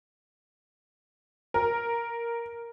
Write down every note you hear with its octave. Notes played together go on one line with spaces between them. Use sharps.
A#4